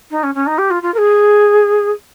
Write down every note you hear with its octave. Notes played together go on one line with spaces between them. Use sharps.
D#4
C#4
C#4
D#4
G4
F4
F4
A#4
G#4